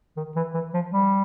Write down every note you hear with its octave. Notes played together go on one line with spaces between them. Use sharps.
D#3
E3
E3
F3
G3